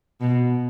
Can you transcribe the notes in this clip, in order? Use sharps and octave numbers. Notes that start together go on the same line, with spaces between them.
B2